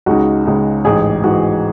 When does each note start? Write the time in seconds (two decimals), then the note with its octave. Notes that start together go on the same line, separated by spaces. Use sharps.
0.06 C#2 C#3 G#3 D#4 F#4
0.46 C#2 C#3 G#3 D#4
0.85 A1 G#2 E3 G#4
1.24 A1 G#2 E3 F#4